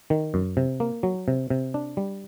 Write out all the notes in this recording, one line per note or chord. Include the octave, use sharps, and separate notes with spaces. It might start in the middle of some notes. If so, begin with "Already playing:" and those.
D#3
F#2
C3
A#3
F#3
C3
C3
D4
G3